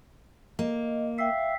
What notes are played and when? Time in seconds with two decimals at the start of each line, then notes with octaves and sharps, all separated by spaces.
0.59 A#3 D#5
1.19 E5 F5 G5 E6